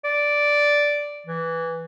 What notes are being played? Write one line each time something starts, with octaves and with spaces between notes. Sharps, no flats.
D5
E3